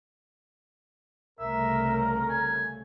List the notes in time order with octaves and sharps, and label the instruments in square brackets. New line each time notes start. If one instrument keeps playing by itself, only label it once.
[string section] C2 C#3 A3 [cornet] A#4 [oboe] E5
[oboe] G#5